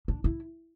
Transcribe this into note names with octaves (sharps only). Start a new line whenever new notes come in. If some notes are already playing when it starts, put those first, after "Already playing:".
D4
E4